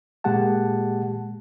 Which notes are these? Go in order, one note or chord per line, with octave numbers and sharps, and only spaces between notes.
A#2 G#3 A#3 G4 F#5 A5